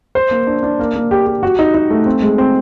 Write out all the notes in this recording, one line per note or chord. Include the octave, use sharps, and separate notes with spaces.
C5
A#3
D4
D4
A#3
A#3
G4
G4
F#4
D#4
D#4
A3
C4
G#3
C4